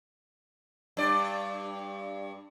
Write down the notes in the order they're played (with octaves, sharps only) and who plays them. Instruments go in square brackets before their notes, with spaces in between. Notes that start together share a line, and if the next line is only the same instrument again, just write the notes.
[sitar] G2 D5